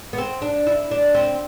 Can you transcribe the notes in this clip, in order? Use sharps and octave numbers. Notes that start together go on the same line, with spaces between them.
B3
C4
D4
E4
D4
C4